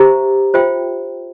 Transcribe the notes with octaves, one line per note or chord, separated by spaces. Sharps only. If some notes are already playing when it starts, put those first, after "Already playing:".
Already playing: G4 C5 E5 A#5
F4 C5 E5 G5